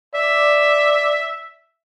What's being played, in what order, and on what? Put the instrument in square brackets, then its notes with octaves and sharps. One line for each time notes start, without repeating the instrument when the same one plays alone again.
[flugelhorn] D5 [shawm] E5